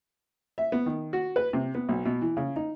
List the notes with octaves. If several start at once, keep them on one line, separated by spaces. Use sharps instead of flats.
E5
B3
D#3
F#4
B4
C3
B3
B1
B2
E3
C#3
D#4